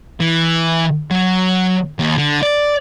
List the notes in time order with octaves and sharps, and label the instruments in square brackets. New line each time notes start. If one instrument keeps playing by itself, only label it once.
[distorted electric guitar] E3
F#3
D#2
D3
D5